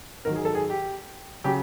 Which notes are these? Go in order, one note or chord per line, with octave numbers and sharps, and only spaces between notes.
G#2 D#3 F#3 A#4
G#4
A4
G#4
G4
C#3 F#3 G4